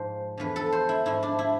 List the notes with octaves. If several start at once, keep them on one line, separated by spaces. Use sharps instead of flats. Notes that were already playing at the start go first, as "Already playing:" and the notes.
Already playing: G#2 F3 C5
E2 D3 F3 B4
A4
C5
E4
G#2 F3 E4
D4
E4